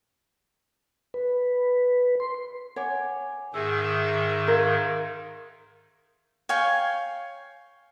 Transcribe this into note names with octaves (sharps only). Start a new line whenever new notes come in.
B4
C6
C#5 F#5 G#5 D6
G#2 D#3 G#4 E5 E6
A#4 F5 C6 G#6
C#5 F5 G5 G#5